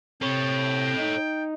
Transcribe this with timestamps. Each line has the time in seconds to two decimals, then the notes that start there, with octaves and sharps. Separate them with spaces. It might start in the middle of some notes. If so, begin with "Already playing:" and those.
0.22 C3 A4 C#5 G5
0.98 D#4